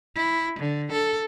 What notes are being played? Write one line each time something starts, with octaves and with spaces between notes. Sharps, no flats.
E4
D3
A4